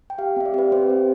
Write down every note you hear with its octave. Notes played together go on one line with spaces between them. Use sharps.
G5
G4 F5
C4 E5
D5
G4 B4
C4 C5
G4